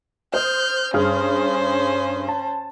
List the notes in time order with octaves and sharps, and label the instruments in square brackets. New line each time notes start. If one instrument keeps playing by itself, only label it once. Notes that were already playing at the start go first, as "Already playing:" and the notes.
[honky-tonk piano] C5 D#6 [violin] F6 G6
[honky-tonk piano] G2 G#4 F6 [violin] C#4 C5
[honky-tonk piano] A5